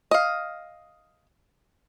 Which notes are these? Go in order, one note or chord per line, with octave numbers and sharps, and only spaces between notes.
D#5 F5